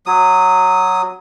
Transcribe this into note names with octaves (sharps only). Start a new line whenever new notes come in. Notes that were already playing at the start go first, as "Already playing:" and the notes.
F#3 D#6